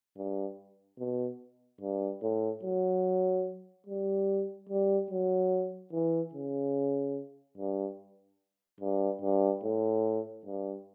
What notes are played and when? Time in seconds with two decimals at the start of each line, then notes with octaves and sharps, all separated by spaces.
0.17 G2
0.99 B2
1.81 G2
2.22 A2
2.63 F#3
3.87 G3
4.69 G3
5.11 F#3
5.92 E3
6.34 C#3
7.57 G2
8.80 G2
9.22 G2
9.64 A2
10.46 G2